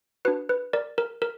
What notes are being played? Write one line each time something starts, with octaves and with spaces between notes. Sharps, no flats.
D4 F#4 B4
B4
A#4 D5
A#4
A#4